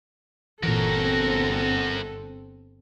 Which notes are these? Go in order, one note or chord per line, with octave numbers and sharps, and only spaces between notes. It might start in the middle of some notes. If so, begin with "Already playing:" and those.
G1 A#2 E3 C4 F#4 A4 A#4